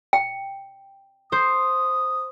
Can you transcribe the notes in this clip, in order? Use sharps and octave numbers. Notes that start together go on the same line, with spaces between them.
G5
C5 D#6